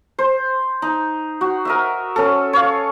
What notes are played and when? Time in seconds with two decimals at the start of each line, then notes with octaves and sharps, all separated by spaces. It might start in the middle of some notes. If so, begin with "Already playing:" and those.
0.19 C5
0.82 D#4
1.41 F#4
1.65 A#4 D#5 E5
2.16 C#4 A4
2.53 C#5 F5